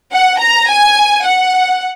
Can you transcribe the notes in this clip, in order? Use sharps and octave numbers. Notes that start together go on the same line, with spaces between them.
F#5
A#5
G#5
F#5